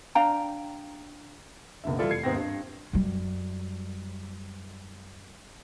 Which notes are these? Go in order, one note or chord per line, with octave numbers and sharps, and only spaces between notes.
D4 F5 G5 A#5
F#1 C#2 B2 D3 E5
E3 G3 E4 F4 A4 D5
F1 G#6 C7 C#7
D#2 G#2 B3 C4 G5 A#6
G2
F#2 G3